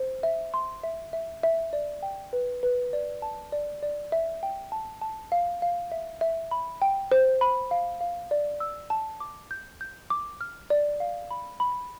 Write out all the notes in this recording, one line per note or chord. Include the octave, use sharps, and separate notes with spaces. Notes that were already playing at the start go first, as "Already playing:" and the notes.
Already playing: C5
E5
C6
E5
E5
E5
D5
G5
B4
B4
D5
A5
D5
D5
E5
G5
A5
A5
F5
F5
E5
E5
B5
G5
C5
B5
F5
F5
D5
E6
A5
D6
G6
G6
D6
F6
D5
F5
B5
B5